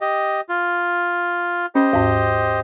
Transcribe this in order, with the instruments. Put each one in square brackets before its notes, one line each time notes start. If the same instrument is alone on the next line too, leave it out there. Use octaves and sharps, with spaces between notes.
[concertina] G4 D#5
F4
[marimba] C#4 [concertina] G4 C5 D#5
[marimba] D#2 G#2